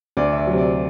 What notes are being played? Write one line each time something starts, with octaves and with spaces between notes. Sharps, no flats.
D2 D5
E5
D5
C3 F#3
D5